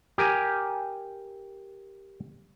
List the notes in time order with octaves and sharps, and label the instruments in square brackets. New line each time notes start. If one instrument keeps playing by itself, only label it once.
[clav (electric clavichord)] G4 A#4 G#5